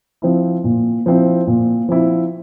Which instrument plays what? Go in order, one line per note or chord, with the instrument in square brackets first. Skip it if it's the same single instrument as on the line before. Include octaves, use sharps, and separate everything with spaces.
[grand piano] F3 C4 E4
A#2
F3 C4 E4
A#2
F3 C4 E4